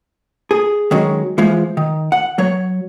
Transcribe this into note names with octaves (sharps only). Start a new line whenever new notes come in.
G#4
D#3 F#3 G#3 C#4
E3 F3 G#3
D#3
F#5
F#3 C#5